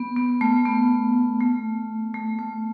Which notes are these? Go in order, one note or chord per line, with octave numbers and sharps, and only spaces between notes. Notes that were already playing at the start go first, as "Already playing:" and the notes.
Already playing: B3
B3
A3
B3
A3
A3
A3